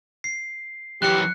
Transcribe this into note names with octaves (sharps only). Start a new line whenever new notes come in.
C7
F#2 E3 G4 F#6 C#7